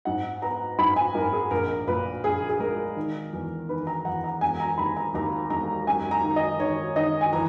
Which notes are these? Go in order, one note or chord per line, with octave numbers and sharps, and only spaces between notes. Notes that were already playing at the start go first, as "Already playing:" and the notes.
G#2 F#5
B3 A#5
G#2 B5
G#5
G#2 A#4
G#4
A#1 A#4
A#2 B4
A#1 G#4
G#4
G#3 A#4
D#3
E2
D#3 B4
A#5
E2 F#5
A#5
E1 G#5
A#5
D#2 B5
A#5
D#2 A#5
E1 A#5
F#2 G#5
A#5
D#3
D#5
D#3 C#5
D#3 D#5
G#5
E3 A#5